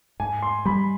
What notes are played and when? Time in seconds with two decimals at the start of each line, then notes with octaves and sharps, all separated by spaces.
0.20 G#2 G#5
0.43 C6
0.65 G3 B5